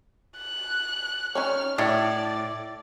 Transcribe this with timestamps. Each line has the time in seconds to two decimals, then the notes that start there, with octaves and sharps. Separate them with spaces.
0.37 F#6
1.35 C#4 D#4 C#5 F6
1.78 A2 D4 C#5 D5